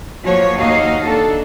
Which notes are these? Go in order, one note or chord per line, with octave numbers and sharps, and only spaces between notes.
F3 A#3 F#4 C#5
D#2 D#4 F#4 D#5 F5
D4 A4